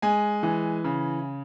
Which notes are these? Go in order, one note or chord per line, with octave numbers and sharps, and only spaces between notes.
G#3 G#5
E3
C#3